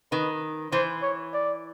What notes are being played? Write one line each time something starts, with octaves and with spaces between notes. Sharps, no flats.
D#3 B4
E3 C5
C#5
D5